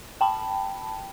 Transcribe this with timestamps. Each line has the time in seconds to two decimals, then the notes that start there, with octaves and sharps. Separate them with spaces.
0.21 G5 A5 B5